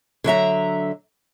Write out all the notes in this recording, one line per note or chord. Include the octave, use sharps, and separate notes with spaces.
D3 F#3 E5 A#5